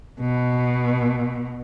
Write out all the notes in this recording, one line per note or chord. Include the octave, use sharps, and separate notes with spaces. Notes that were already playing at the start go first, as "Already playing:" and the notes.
B2